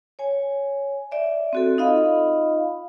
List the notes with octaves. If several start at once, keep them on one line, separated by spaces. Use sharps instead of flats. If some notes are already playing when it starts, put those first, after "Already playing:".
C#5 G#5
D5 E5
C4 F#4 A4
D#4 F4 D#5 F5 B5